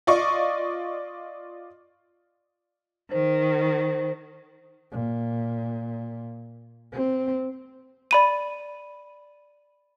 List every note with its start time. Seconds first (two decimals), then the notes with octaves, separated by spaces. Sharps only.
0.07 F4 D5 D#5 C#6
3.11 D#3 C5
4.92 A#2
6.92 C4
8.11 D5 B5 D#7